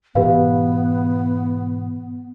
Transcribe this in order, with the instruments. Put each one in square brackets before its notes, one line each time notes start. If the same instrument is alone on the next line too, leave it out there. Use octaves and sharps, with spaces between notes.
[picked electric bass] G#2 B2 E3 [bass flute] B3 [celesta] G4 B4 F5